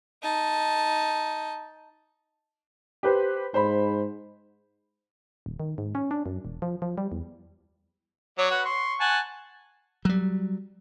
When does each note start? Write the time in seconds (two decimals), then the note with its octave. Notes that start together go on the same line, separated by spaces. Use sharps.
0.23 D#4 A5
3.03 G4 B4 C5
3.54 G#2 C5 B5
5.46 D#1
5.60 D#3
5.78 G#2
5.95 C#4
6.11 D4
6.26 F#2
6.45 E1
6.62 F3
6.82 F3
6.98 G3
7.12 E2
8.38 F#3 C#5 D5
8.51 F#4 B4
8.65 C6 C#6
9.01 F#5 G#5 A5
10.05 F#3 G3